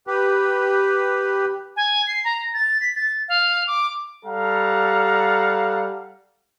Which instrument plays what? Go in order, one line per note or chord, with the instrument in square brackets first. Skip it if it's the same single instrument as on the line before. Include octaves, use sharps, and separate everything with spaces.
[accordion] G4 B4
[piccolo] G#5
C7
A#5
A6
B6
A6
F5
D6
[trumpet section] G3 A4 F5 F#5 A#5